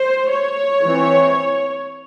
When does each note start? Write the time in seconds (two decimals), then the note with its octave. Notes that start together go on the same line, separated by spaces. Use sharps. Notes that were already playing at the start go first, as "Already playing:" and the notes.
Already playing: C5
0.30 C#5
0.83 E3 C4